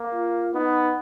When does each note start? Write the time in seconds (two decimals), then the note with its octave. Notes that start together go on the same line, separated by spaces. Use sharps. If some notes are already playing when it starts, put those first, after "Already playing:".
Already playing: A#3
0.13 F4
0.54 B3 D#4